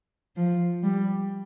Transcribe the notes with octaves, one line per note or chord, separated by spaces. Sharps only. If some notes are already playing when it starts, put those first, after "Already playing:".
F3
G3